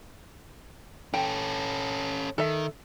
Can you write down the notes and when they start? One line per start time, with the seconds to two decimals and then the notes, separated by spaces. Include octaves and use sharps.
1.14 C#4 A4 G5
2.38 D#3 A4 E5